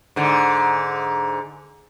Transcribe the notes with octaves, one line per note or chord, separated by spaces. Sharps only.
G#2 D3